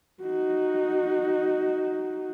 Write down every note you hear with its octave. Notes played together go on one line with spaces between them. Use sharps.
D#4 F#4